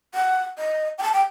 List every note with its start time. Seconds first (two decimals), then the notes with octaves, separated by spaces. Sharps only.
0.14 F#5
0.58 D#5
0.98 G5
1.03 A5
1.13 G5